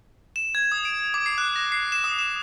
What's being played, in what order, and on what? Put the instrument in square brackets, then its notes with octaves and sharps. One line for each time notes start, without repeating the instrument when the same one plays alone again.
[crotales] E7
G#6
D#6
D7
D6
C7
F#6
A#6
C7
E7
D#6
E7